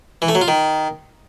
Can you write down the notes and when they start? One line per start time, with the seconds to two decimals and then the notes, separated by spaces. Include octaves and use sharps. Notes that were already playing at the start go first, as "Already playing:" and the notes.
0.22 E3
0.28 A3
0.35 F#3
0.41 F4
0.48 D#3